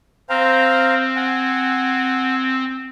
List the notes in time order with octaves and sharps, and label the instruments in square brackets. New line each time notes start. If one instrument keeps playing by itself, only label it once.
[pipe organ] C4 [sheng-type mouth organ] C5 F5 A#5
[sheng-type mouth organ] F#5 G#5